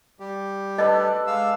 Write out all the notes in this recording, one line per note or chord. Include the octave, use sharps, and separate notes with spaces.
G3 G4
D4 A4 B4 D#5
G#3 F5 E6